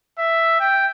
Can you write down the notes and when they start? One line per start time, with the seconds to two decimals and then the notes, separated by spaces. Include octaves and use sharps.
0.18 E5
0.60 G5